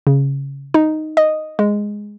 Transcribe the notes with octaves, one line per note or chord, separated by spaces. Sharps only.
C#3
D#4
D#5
G#3